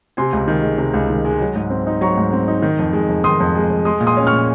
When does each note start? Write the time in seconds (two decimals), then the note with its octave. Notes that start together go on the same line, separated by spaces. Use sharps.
0.17 C3 G#5 C6
0.33 C#2
0.48 D#3
0.63 G#3
0.78 C3
0.94 C#2
1.10 D#3
1.25 G#3
1.40 F#3
1.56 G#2
1.70 C4
1.87 D#4
2.01 F#3 A#5 C#6
2.17 G#2
2.33 C4
2.48 D#4
2.62 D#3
2.79 F2
2.93 G#3
3.09 F2
3.24 D#3 C6 D#6
3.40 F2
3.55 G#3
3.70 F2
3.85 G#3 C6 D#6
4.01 A#2
4.07 C6 D#6
4.17 C#4
4.27 C#6 F6
4.32 A#2